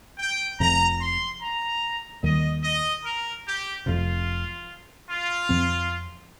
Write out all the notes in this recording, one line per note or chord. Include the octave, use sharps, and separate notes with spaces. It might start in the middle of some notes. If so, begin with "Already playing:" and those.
G5
F1 F2 C3 A#5
C6
A#5
D#2 D#3 G3 D#5
D#5
A#4
G4
F1 F2 C3 F4
F4
F2 F3 C4